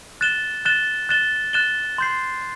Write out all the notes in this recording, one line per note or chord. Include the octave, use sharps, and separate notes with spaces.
F#6 A6 E7 G7
F#6 A6 E7 G7
F#6 A6 E7 G7
F#6 A6 E7 G7
C6 G6 C7